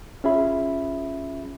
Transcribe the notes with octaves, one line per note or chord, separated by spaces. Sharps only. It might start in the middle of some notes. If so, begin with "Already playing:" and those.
C#4 F4 G#4 E5 B5